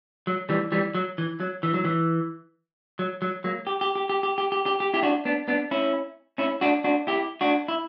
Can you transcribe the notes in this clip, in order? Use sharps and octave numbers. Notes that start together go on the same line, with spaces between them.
F#3
E3 G3
E3 G3
F#3
E3
F#3
E3
F#3
E3
F#3
F#3
F#3 A#3
G4
G4
G4
G4
G4
G4
G4
G4
G4
E4 G4
D4 F#4
B3 D4
B3 D4
C#4 E4
C#4 E4
D4 F#4
D4 F#4
E4 G4
D4 F#4
E4